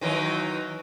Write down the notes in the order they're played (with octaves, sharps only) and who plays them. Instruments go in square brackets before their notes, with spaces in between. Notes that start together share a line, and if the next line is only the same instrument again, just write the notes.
[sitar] D#3 E3 F#3